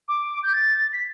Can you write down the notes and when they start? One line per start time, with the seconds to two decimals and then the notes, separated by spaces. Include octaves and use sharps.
0.08 D6
0.43 G6
0.53 A6
0.93 B6